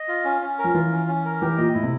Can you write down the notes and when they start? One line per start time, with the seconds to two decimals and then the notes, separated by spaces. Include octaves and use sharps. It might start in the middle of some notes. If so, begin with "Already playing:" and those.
Already playing: D#5
0.08 F4
0.24 C#4
0.42 C#4
0.59 A#4
0.64 F3
0.74 E3 F4
0.92 C#4
1.08 C#4
1.25 A#4
1.41 E3 G4
1.57 A#2 D#5
1.74 A2 E4
1.83 C3